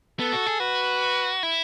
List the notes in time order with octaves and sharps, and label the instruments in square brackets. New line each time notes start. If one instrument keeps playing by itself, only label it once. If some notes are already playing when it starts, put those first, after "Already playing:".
[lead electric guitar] B3 [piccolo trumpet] A4
[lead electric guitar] F#4
G#4
[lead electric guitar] F#4 [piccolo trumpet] B4
[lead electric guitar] E4